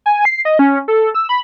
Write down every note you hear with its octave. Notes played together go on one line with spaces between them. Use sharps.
G#5
C7
D#5
C#4
A4
E6
B5